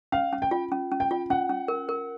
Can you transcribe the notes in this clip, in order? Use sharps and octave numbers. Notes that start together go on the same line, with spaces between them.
C#4 F5
C#4
G5
F4
C#4
C#4
G5
F4
C#4 F#5
C#4
A#4
A#4